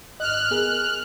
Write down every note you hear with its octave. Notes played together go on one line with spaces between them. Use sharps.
G#1 D#5 F6 F#6
B3 G#4 A#4